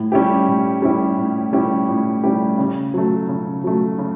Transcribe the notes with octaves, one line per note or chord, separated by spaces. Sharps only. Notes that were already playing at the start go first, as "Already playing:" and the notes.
Already playing: A2
G3 C#4 E4 G4
A2
G3 C#4 E4 G4
A2
G3 C#4 E4 G4
A2
G3 C#4 E4 G4
C#3
F#3 A3
C#3
F#3 A3
C#3